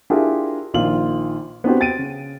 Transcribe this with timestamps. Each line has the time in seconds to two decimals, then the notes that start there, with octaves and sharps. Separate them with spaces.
0.10 D4 E4 F4 G4 G#4 A#4
0.74 A#1 D#3 F4 F#7
1.64 B3 C4 D4 F#4 G4 C5
1.80 G5 A6 D7 D#7
1.99 C#3